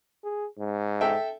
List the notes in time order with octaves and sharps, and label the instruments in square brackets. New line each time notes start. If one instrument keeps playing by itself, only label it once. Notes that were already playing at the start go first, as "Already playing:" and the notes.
[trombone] G#4
G#2
[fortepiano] A4 E5 G5